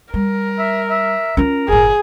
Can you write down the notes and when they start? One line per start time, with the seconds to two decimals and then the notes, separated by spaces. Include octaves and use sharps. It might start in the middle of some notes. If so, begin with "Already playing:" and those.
0.14 G3 A#4
0.58 E5
0.90 E5
1.37 C#4 F4 A#4
1.68 G1 A2 G#4